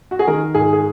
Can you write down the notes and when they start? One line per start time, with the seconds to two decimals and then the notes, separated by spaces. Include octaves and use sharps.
0.11 F#4
0.19 G#4
0.27 D#3 A#4
0.55 G#2 G#4
0.73 G#4